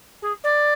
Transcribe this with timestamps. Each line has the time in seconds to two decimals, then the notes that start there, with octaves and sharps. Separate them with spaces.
0.22 G#4
0.44 D5